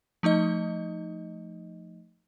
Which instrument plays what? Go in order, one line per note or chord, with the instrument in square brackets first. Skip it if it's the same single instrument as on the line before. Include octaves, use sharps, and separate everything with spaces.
[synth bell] F3 A3 D#4 D#5